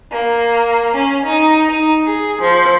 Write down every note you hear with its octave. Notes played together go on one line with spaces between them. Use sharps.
A#3
C#4
D#4
D#4
G#4
F3